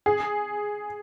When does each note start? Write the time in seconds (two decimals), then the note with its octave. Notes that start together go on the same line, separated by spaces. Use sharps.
0.06 G#4